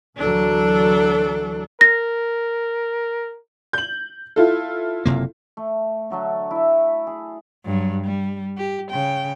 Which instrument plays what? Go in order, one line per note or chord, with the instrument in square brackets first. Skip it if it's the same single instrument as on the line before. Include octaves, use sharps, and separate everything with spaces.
[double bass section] D2 E3 F#3 [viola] D4 A4
[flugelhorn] A#4 [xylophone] A#6
[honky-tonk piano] G6 F#7
E4 F4 A4
[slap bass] F#1 C3 A#3
[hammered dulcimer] A3
D3 F#3 A3 A4
E4 E5
G#4
[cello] G2 F#3
G3
G4
C#3 G5